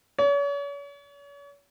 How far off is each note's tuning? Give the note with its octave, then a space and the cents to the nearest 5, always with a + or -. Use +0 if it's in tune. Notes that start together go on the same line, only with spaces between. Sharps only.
C#5 +40